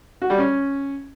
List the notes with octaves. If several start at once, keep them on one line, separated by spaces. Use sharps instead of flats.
F#4
G3
C#4